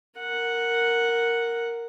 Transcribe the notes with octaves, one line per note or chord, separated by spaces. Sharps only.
A#4 F#5